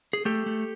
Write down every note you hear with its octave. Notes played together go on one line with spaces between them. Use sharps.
G#4
A3 G4 A4
A3